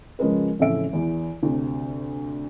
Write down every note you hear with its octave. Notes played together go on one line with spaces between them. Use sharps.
C#3 F3 G#3 C#4 A#4 B4
A1 F2 C#3 A4 E5 D7
E2 E3
D2 C3